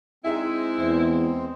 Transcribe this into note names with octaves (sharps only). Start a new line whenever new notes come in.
G#3 C4 D#4 E4 G#4 E5
E2 C5